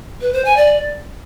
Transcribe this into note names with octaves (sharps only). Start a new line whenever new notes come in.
B4
C5
G#5
D5